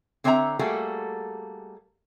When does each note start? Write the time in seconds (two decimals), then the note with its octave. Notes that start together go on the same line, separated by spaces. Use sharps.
0.24 D3 C4 C#5 E5 G5 A#5
0.59 G3 A3 A#3 F#4 G#4 A4